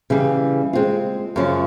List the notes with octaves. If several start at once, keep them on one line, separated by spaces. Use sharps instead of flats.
C#3 E3 G3
G#3 C4 F4
F#2 C#3 F3